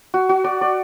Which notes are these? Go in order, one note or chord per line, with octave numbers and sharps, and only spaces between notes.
F#4
F#4
D5
D5